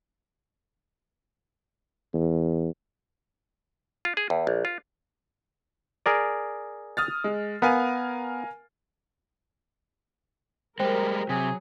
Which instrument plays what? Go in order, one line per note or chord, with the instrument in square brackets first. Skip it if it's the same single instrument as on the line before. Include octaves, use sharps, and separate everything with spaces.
[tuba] E2
[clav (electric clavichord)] F4
G#4
E2
A#1
F4
G#4 A#4 D5
[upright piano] D#6 F6 A6
G#3
[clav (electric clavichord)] B3 [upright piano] A#4 F5 G#5
[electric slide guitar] G3 G#3 [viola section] A#4 [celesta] C5 G5
[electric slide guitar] C3 [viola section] F#3 [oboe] G#4